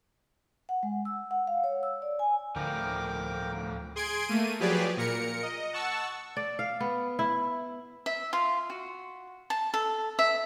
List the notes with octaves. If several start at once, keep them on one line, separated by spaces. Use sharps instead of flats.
F#5
G#3
E6
F#5
F5
C#5
E6
D5
G#5
D2 A2 F3 A#4 G5 D6
G#4 C6 G#6 D7
A3 A#3 D#7
F3 F#3 G4 G#4 B4 D5
A#2 A#4 C#7
D#5
F#5 A5 C#6 E6
D5
F5
B3
E4
E5
F4
F#4
A5
A4
E5